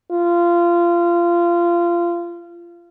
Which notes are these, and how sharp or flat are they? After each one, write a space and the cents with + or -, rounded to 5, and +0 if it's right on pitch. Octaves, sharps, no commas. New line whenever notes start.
F4 -20